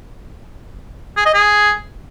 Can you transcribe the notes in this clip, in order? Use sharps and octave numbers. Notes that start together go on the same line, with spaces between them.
G#4
D#5
G#4